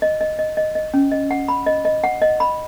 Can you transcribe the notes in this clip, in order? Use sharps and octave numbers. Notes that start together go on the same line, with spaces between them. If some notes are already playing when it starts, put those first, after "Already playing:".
D#5
D#5
D#5
D#5
D#5
C#4
D#5
F#5
B5
D#5
D#5
F#5
D#5
B5